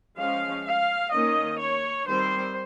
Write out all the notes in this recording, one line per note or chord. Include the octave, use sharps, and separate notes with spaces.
F3 G#3 C#4 F5
F5
D#3 A#3 C#4 D#5
C#5
D#3 G3 C4 C5